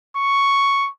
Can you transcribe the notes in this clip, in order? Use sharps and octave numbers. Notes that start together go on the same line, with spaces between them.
C#6